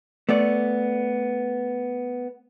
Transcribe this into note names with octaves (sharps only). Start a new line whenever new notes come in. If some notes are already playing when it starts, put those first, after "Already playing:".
A3 B3 D5